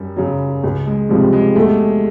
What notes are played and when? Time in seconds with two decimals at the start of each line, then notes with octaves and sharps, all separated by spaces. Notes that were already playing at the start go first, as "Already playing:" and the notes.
Already playing: F#2 G3
0.17 C#3 F#3
0.64 C#2
0.86 G#3
1.09 C3 F3 G3 G#3 C4
1.33 G#3
1.56 E2 A3